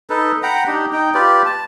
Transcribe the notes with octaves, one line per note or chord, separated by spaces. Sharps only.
D#4 A4 B4
F#5 G5 A#5 B5
D4 D#4 G4
D#4 G5
F4 G4 B4 D5
A5